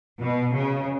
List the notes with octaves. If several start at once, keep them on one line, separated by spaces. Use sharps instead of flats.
B2
C#3